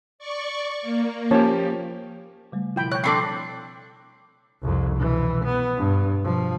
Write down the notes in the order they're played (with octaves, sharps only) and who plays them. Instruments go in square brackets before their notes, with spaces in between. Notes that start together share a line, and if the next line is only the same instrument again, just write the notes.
[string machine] D5 C#6
A#3
[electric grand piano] F3 G4 [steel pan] C#4 C#5 A5
[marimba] C#3 G3 A3
[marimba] B2 F3 E4 [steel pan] F4 G5 B5
[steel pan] C#5 G5 [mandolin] F#6
[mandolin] C4 D4 D6 [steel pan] A4 B5 C#6
[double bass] C2 F2
B2 E3
B3
G2
B2 F3